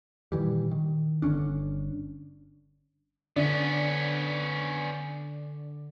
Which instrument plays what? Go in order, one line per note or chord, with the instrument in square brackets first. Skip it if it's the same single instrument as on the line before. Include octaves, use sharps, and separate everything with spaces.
[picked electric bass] A#2 D#3 E3 G3
D#3
G1 D3 C#4 D4
[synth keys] D3 [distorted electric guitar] B3 C#4 [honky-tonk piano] D4